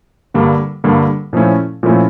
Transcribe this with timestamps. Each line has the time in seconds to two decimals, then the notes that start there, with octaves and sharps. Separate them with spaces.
0.34 G2 D3 G3 A#3
0.84 G2 D3 G3 A#3
1.33 A#2 F3 A3 C#4 E4
1.83 A#2 F3 A3 C#4 E4